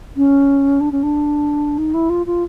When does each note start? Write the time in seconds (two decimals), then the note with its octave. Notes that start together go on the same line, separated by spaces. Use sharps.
0.17 C#4
0.80 D4
0.92 C#4
1.03 D4
1.78 D#4
1.94 E4
2.10 F4
2.26 F4